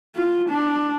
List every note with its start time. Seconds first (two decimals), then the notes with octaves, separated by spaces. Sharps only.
0.16 F4
0.49 D4